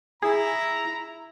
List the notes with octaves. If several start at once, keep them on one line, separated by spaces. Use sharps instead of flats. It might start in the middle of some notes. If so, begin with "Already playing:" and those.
E4 G#4 A#5